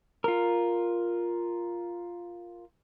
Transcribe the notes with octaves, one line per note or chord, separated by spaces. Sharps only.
F4 A#4